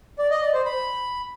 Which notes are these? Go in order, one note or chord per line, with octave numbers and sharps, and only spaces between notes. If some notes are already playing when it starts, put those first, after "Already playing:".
D5
D#5
D5
C5
B5